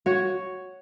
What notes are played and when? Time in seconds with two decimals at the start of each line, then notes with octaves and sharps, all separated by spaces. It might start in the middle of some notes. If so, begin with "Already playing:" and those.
0.06 F#4 C#5